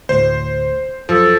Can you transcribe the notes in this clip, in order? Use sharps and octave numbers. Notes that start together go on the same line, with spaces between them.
D2 A2 C5
F#2 F3 A4